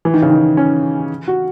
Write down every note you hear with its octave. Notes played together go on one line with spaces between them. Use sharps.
E3
D#3
C#3
D#3
C#4
F#4